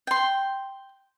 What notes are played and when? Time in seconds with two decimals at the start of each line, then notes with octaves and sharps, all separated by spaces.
0.07 G5 C6